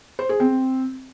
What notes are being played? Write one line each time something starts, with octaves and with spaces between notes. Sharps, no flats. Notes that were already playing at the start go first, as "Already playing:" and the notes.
C5
G#4
C4